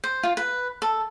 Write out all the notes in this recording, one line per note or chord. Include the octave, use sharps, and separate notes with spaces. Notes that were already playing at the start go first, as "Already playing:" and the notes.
C5
F4
B4
A4